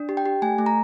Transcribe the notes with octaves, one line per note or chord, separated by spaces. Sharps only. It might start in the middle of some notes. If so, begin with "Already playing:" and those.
Already playing: D4
G4
G5
G4
A3 G#5
A3
A#5